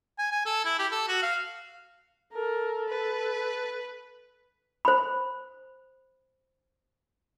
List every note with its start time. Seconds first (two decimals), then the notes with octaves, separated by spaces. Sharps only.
0.18 G#5
0.31 G#5
0.46 A4
0.65 E4
0.79 G4
0.92 A4
1.08 F#4
1.22 F5
2.32 A4 A#4
2.88 B4
4.85 C5 B5